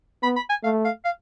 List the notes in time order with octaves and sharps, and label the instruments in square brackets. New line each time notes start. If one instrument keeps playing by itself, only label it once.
[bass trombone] B3 [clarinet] B5
[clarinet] B5
G#5
[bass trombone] A3 [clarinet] F5
[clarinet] F5
F5